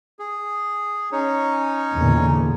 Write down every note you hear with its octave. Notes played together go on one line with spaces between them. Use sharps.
G#4
C#4 D#4 C#5
E2 A#2 D3